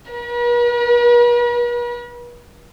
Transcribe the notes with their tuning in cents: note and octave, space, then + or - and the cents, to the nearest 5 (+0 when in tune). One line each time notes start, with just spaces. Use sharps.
B4 -45